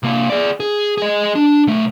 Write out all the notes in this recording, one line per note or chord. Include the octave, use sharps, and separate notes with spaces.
C3 A#3
G#4 D5
G#4
G#4 D#5
D4
B1 A3